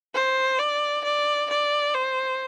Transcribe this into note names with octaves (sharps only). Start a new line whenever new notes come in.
C5
D5
D5
D5
C5